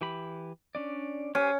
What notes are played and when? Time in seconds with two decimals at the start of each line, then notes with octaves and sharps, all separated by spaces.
0.01 E3 G4 B5
0.75 C#4 D4 D5
1.35 C#4 G4 C5 G#5